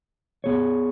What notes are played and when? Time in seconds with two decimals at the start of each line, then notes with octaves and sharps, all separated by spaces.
0.44 B3 G#4 C#5